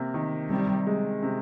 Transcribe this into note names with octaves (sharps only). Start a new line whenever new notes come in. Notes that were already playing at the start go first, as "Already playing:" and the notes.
Already playing: C3 A#3
D#3
C3 G3
G#3
C3